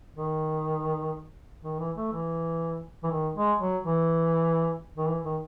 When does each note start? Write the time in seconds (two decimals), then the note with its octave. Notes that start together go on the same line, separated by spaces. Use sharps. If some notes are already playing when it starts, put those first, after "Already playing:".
0.16 D#3
1.64 D#3
1.80 E3
1.97 A3
2.12 E3
3.03 E3
3.11 D#3
3.36 G#3
3.60 F#3
3.85 E3
4.97 D#3
5.08 E3
5.24 D#3